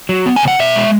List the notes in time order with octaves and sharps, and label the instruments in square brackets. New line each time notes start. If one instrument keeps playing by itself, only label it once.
[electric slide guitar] F#3
B3
G#5
C#3 F#5
B2 E5
G#3